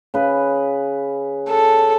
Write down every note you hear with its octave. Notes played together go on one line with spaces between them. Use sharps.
C#3 B4
A4